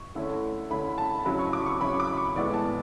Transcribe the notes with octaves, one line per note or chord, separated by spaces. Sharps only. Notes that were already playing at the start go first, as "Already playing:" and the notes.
Already playing: C#6
D3 A3 C#4 E4
D3 A3 C#4 E4 B5
A5
C#3 F#3 C#4 E4 B5
C#6
D6
C#6
C#3 F#3 C#4 E4 B5
D6
C#6
A2 E3 G#3 B3 E4 D5
A5